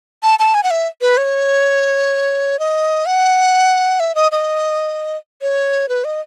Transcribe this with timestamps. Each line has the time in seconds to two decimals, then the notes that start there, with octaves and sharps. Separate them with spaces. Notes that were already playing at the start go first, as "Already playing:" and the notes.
0.23 A5
0.39 A5
0.54 G#5
0.63 F#5
0.71 E5
1.01 B4
1.17 C#5
2.59 D#5
3.06 F#5
4.00 E5
4.15 D#5
4.32 D#5
5.42 C#5
5.89 B4
6.04 D#5